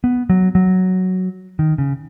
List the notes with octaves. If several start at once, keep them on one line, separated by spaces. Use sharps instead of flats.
B3
F#3
F#3
D#3
C#3